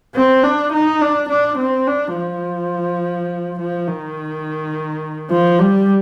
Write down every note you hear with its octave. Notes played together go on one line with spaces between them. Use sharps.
C4
D4
D#4
D4
D4
C4
D4
F3
F3
D#3
F3
G3